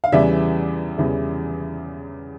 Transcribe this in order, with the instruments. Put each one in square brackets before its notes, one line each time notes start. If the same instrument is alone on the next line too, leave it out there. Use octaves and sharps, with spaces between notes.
[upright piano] F5
E2 C#3 E3 G3 D5 E5
E2 C#3 E3 G3